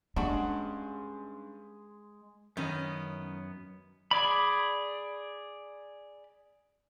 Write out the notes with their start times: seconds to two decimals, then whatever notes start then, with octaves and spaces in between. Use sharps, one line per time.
0.16 G2 G#3 C#4 D4 F#4
2.57 F#2 D#3 B3 C#4 D#5
4.11 G#4 D5 B5